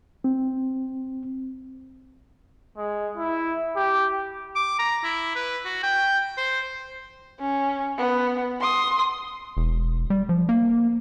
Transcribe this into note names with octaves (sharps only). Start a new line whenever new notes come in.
C4
G#3
E4
G4
D6
A#5
E4
B4
F#4
G5
C5
C#4
B3
C6 D#6
E1
G3
F3
A#3